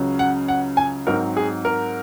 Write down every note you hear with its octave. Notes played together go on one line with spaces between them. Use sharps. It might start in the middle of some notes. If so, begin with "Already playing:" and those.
Already playing: C#2 C#3 F#3
F#5
F#5
G#5
G#2 F#3 C4 D#4 A#4
G#4
A#4